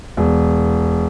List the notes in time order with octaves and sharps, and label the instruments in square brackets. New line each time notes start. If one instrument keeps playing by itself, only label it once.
[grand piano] E1